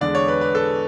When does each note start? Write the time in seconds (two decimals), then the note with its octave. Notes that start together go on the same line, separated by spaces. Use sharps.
0.01 E2 D3 G#3 D4 D5
0.15 C#5
0.28 B4
0.41 B4
0.55 A4